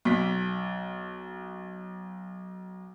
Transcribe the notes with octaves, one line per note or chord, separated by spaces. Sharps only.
B1 B6